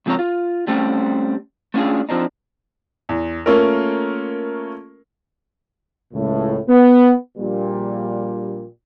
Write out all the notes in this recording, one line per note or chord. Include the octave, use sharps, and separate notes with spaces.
C#2 F3 C4 G#4 A#4 C#5
F4
G3 A3 C4 C#4
A3 B3 C#4 D4 F4 G#4
F3 C4 D4 D#4
E2
A3 A#3 C#4 F4 A4 A#4
C#2 A2
B3
A#1 A#2 G3